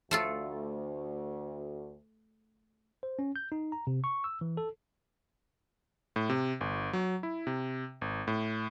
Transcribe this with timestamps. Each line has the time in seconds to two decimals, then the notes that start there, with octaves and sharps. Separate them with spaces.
0.11 D2 A3 F4 A4
3.03 C5
3.19 C#4
3.36 G6
3.52 D#4
3.72 A#5
3.87 C3
4.04 C#6
4.24 E6
4.41 E3
4.57 A4
6.16 A2
6.29 C3
6.61 G1
6.93 F#3
7.23 E4
7.47 C3
8.01 G#1
8.28 A2